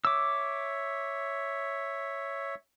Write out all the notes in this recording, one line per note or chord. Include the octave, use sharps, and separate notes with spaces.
C#5 E5 D6 E6